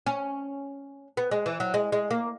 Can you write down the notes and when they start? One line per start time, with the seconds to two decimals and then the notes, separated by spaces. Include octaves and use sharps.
0.06 C#4
1.17 B3
1.31 G#3
1.46 E3
1.60 F#3
1.74 G#3
1.92 G#3
2.11 A#3